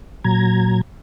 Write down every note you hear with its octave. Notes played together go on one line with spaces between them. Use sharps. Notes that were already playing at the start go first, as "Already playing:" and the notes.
A#2 F#3 A#5 G#6